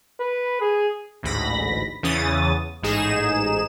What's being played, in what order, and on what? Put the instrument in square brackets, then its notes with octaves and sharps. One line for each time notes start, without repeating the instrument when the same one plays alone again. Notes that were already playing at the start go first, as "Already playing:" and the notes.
[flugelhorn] B4
G#4
[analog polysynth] A1 D2 G#2 B5 A#6
E2 C#3 E3 C#4 D#6 A6
A1 G#2 D#4 G#4 E7